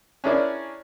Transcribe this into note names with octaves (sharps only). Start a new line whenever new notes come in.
C#4 D4 E4 G#4 A#4 D5